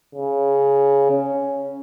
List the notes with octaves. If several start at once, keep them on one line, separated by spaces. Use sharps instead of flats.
C#3
C#4